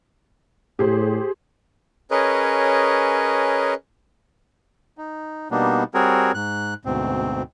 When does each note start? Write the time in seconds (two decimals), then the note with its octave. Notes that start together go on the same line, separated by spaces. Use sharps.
0.79 A2 G4 G#4 C5
2.11 C#4 G#4 A#4 B4 C#5 D#5
4.98 D#4
5.51 B2 G3 A#3 B3 D4 D#4
5.94 G3 C4 F#4 G#4 A#4 C#5
6.34 G#2 F#6
6.85 D2 G#2 B2 C4